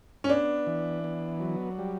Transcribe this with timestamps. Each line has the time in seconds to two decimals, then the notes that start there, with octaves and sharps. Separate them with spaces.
0.24 C#4
0.29 B3 D4
0.67 E3
1.04 B3
1.40 F#3
1.79 G3